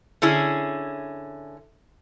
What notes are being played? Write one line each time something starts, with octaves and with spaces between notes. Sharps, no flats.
D3 C#4 E4 G#4